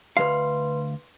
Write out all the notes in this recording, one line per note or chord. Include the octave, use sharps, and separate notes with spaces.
D2 E3 B4 F5 C6